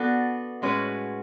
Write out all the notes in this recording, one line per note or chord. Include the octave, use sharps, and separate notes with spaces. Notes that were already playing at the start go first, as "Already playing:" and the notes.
Already playing: B3 D4 F#4 A4
A2 G#3 C#4 F#4 B4